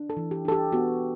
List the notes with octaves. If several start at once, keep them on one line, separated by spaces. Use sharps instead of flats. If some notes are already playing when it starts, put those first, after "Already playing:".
Already playing: D4
A4
E3
G4
D4 A4
G4
B3 F#4